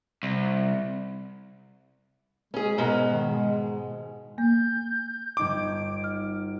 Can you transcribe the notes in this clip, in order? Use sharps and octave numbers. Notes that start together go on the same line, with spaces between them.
C2
G#3 C#4 G#4
G#2 B2 A#4
D#3
G#3
A#3 G6
G1 D#4 D6 G#6 D7
F6